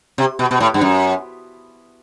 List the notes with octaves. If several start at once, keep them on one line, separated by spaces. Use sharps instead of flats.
C3
B2
B2
A2
G2
F#2